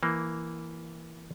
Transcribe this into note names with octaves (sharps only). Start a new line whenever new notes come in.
E3 A#3